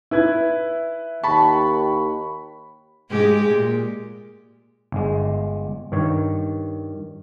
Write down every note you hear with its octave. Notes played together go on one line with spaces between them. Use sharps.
E4 B4 E5 G#6
D#2 A5 B5 C#6
G#2 G#3 G4
A#2
G1 G#3
G2 D#3 C#5